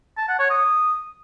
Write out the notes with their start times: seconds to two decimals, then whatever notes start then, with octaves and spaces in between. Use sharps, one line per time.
0.17 A5
0.28 F#5
0.39 C#5
0.50 D#6